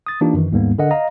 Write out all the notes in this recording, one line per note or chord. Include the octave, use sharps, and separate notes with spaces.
D#6 A6
E3 A#3 D4 D#4 F4 G4
F#2 D#3 E3
D#2 G#2 G3 A#3 B3
D3 A#4 D#5 F#5
D#5 F5 A#5